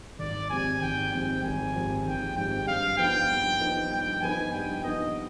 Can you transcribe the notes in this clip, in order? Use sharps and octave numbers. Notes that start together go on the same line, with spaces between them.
G#1 D5
G#2 F3 C4 G4 G#5
G#1 G5
G#2 F3 C4 G4 G5
G#1 G#5
G#2 F3 C4 G4
G#1 G5
G#2 F3 C4 G4 G5
G2 F5
F3 B3 D#4 B4 G5
G2
F3 B3 D#4 B4
G2 G5
F3 B3 D#4 B4 G#5
G2 G5
F3 B3 D#4 B4 D#5